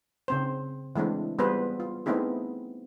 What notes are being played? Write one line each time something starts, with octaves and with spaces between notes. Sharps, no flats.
C#3 C4 C5
E3 G#3 A3 C4 D4
G3 B3 F4 G#4 B4 C5
F4
A3 B3 C4 D#4 E4 G#4